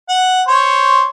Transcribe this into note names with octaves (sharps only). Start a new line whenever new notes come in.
F#5
C5 C#5